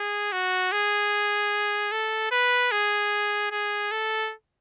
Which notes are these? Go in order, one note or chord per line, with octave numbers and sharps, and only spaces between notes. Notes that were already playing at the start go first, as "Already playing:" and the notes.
Already playing: G#4
F#4
G#4
A4
B4
G#4
G#4
A4